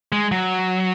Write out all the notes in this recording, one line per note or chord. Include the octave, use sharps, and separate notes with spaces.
G#3
F#3